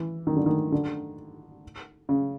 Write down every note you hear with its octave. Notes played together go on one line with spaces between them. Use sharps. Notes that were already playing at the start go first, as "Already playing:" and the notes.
Already playing: E3
D#3
D3
D#3
D3
C#3